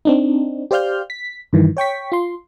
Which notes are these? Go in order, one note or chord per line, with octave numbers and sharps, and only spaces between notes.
C4 D4 D#4
G4 C5 D5 F5 F6 G6
B6
G2 D#3 E3
C#5 G5 C#6 B6
F4 C6